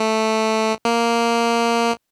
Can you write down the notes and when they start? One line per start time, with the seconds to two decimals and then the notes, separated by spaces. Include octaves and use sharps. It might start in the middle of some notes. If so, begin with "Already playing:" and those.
Already playing: A3
0.85 A#3